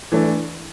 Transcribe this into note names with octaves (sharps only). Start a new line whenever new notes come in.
E3 A3 D4